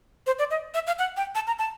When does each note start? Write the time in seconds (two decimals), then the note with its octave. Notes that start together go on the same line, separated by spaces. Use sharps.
0.27 C5
0.39 D5
0.51 D#5
0.74 E5
0.87 F5
0.99 F#5
1.17 G5
1.35 A5
1.47 A#5
1.59 A5